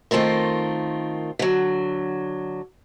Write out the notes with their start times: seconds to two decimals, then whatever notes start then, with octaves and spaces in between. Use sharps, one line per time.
0.11 D#3 A3 C4 F4 A#4
1.39 D3 F#3